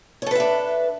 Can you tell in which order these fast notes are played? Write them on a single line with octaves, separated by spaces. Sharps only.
C#5 A4 B4 E5 D4